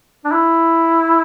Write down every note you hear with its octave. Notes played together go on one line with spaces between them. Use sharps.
D4
E4